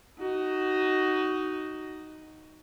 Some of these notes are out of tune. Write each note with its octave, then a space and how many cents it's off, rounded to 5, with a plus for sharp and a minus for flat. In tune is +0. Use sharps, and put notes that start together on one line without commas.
D#4 +0 F#4 +15